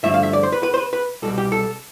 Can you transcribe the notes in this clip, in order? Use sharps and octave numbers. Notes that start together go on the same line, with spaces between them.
G2 D3 F3 A3 E5
F5
E5
D5
C5
B4
B4
C5
B4
B4
C2 B2 G3 A4
G4
A4